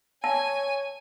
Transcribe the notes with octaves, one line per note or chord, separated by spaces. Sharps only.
C#5 G#5 A5